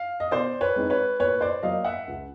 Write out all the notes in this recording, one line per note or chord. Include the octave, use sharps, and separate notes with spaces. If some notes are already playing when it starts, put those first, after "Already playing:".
Already playing: F5
D#5
B2 C5 D5
B4 C#5
G#3 C4 D#4
B4 C#5
A#2 B4 C#5
C5 D5
F#3 A#3 D#5 F5
E5 F#5
C#2